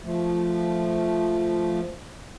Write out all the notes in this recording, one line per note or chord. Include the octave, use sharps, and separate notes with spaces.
F3 A3